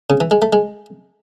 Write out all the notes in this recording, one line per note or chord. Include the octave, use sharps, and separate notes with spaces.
C#3
E3
G#3
A3
G#3